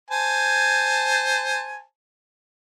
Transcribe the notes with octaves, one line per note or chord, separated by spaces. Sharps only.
C5 G#5 A5